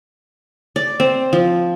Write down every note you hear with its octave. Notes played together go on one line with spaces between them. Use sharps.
D5
C4
F3